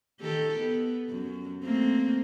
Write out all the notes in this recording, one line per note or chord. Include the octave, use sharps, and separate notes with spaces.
D#3 G4 A4
B3
F#2
A3 A#3 C4